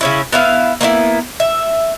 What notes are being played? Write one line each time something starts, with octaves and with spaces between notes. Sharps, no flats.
C#3 C#4 E4
B3 E4 F5
A#3 B3 C#4 E4
E5